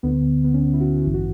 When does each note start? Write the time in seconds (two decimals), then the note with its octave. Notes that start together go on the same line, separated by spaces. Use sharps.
0.03 D2 D3 B3
0.44 B3
0.54 C#4
0.73 E4
0.80 F#4
1.04 A1 G2 E3 E4
1.14 F#4